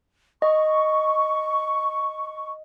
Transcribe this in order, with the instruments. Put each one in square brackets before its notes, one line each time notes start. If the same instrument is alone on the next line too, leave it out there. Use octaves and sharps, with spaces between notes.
[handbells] D#5 [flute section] C#6